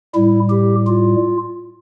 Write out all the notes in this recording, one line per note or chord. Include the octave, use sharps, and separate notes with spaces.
A2 G3 E4
G4
F4